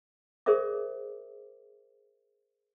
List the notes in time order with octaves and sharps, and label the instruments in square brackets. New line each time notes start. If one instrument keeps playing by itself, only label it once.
[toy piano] G#4 A#4 C5 D5 E5 D6